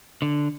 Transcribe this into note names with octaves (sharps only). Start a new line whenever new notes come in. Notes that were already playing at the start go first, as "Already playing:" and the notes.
D3